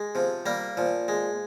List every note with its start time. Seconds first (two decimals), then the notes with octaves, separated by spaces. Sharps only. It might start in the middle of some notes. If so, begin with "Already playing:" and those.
Already playing: G#3
0.15 C3 F3
0.46 G3 A#3
0.77 A#2 F3
1.08 G#3